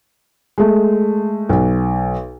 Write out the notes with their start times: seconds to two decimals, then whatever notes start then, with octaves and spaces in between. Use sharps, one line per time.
0.58 G#3 A3
1.49 B1